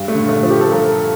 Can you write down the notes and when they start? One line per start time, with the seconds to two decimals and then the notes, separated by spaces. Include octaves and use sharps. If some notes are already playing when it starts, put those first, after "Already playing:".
Already playing: G2
0.08 A3
0.15 D3
0.29 A3
0.43 F3
0.50 G4
0.61 A4
0.71 G2 A#4